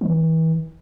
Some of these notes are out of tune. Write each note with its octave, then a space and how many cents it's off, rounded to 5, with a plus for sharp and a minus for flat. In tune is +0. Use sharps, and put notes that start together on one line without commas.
E3 -35